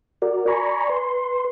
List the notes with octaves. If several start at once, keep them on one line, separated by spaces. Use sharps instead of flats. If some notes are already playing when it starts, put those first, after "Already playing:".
F#4 A#4 D5
D5 G#5 A#5 B5 C#6
B4 C6